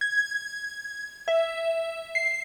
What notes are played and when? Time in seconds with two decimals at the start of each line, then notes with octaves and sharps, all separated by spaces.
0.01 G#6
1.28 E5
2.15 C7